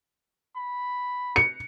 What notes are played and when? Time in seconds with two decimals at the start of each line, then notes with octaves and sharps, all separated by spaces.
0.56 B5
1.36 C#7